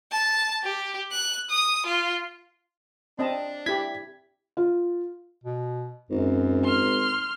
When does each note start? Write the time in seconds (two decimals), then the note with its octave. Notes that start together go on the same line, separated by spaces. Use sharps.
0.12 A5
0.64 G4
1.11 F#6
1.50 D#6
1.86 F4
3.19 C4 D4 D#5 A5
3.66 E4 G4 G#6 B6
4.57 F4
5.44 B2
6.11 G#1 F#2
6.64 C6 F6